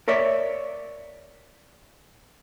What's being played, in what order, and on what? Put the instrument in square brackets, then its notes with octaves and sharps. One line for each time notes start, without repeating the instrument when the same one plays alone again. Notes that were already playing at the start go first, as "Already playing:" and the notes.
[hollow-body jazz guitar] A#4 C#5 D5 E5